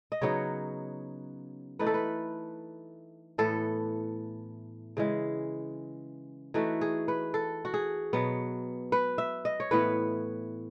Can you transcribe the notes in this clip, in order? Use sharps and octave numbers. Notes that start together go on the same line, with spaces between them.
D#5
C#3 F#3 B3 D#4 C#5
E3 A3 D#4 B4
A4
B4
A2 E3 B3 A4
C#3 E3 G#3
E3 A3 D#4 F#4
G#4
B4
A4
F#4
G#4
B2 F#3 B3
B4
E5
D#5
C#5
A2 E3 B3 B4